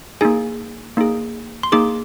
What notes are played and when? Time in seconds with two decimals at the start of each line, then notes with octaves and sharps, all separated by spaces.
0.21 A#3 D#4 G#4 G#5
0.97 A#3 D#4 G#4
1.63 C6
1.72 A#3 D#4 G#4 D6